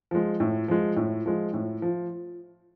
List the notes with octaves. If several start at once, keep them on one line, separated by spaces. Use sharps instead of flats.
F3 G#3
A2
F3 G#3
A2
F3 G#3
A2
F3